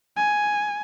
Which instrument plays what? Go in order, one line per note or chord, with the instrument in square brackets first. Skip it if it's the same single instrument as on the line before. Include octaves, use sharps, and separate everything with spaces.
[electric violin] G#5